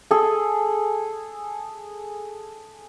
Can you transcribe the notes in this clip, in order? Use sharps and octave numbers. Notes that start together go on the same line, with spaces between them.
G#4 A4